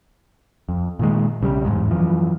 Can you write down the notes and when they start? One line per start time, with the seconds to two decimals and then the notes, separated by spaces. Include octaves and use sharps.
0.69 F2
0.99 A#2 D#3 G#3
1.41 B1 C#3 F#3 G3
1.65 D1 A1 E2 G#2
1.91 F#2 E3 F3